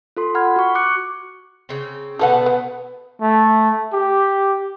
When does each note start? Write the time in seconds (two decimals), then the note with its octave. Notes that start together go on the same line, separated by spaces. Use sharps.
0.17 F4 A4 C6
0.35 F#5 B5 F6 G#6
0.56 F#4 C#6
0.75 D6 F#6 C#7
1.69 C#3 C4
2.19 B2 D3 A3 G4 A4 B4 F#5
2.46 B3
3.21 A3
3.93 G4